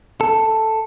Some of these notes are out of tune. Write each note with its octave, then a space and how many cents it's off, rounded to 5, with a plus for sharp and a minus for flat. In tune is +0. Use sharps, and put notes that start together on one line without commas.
A4 +5